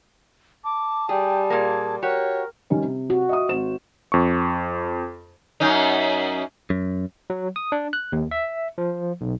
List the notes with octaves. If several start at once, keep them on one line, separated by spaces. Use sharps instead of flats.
A5 D6
G3 G#4 G5
A#2 A#3 G#4
F#4 G4 A#4 C#5
D#3 G3 C#4
C3
F#4
D#5 E5 D#6
G#1 C5 E7
F2 C#6
F#2 C#4 D#4
F#2
F#3
D#6
D4
F#6
D#2
E5
F3
B1